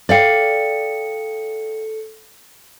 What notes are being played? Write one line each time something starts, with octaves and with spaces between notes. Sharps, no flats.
A4 D5 F5 G5 C#7